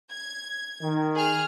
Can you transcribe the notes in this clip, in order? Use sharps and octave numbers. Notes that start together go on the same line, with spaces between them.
G#6
D#3
G#4 F6